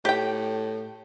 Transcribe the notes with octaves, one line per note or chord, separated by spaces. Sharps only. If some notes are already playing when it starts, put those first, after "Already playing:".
A2 G4 G5